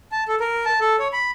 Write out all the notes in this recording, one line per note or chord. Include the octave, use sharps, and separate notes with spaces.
A5
A4
A#4
A5
A4
C#5
B5